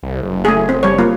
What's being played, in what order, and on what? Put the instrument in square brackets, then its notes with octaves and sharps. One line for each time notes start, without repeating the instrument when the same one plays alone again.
[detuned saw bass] C2
F#1
[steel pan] A3 G#4
C4
G3 C#5
A#3 F4